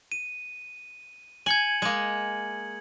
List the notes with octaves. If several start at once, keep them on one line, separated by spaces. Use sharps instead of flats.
D#7
G#5 G#6 C#7 F#7
G#3 A#3